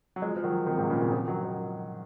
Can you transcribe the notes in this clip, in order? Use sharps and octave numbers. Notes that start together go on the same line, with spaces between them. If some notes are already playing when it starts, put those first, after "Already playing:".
F#3
F3 G#3
F3
D#3 F#3
C3 D#3
G#2 C3
A#2 C#3
C3 D#3
C#3 F3
D#3 F#3
D#3 F#3